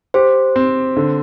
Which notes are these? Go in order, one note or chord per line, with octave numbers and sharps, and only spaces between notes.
G4 C5
C4
D3